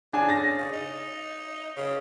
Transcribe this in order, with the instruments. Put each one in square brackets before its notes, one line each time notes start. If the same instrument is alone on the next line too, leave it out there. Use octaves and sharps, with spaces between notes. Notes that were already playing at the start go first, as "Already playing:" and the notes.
[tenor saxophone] C#3 [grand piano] D4 G#5
[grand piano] A6 A#6
[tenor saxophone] C#3
D#4
C#3